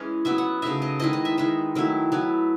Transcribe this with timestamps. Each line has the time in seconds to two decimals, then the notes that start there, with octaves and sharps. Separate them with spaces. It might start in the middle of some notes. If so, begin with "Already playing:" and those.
Already playing: E3 G#3 C#4
0.25 F#3 B3 E4 E5
0.38 F#5
0.62 C#3 F#3 A3 D#4 E5
0.82 D#5
0.99 D#3 G#3 B3 E4 D#5
1.13 D#5
1.25 E5
1.37 D#3 G#3 D#4 E5
1.75 D#3 F#3 A3 E4
2.12 F#3 B3 E4